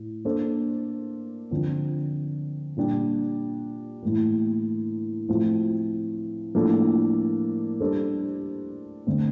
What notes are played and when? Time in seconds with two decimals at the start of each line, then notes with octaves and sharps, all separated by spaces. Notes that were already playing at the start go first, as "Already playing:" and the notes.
Already playing: A2
0.25 A#3 D4 A4 C5
1.51 D3 F3 C4
2.77 A#2 G3 D4 G4
4.03 A2 E3 A#3
5.29 A2 F3 A3 C4 F4
6.55 A2 F3 A#3 D4 A4
7.80 G3 D4 A4 C5
9.07 D3 A3 C4